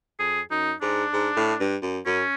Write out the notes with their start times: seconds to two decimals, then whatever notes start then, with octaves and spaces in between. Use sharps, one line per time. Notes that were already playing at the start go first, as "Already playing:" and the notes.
0.19 F2 G#4
0.50 F#2 D#4
0.82 G#2 D4
1.14 G#2
1.37 A2
1.60 G2
1.83 F#2
2.06 F#2 C#4